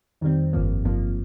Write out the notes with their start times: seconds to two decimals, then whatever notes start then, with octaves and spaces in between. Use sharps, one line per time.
0.21 F2 D#3 G3 C4
0.53 G1 G2 F3 A#3
0.84 G1 G2 F3 A#3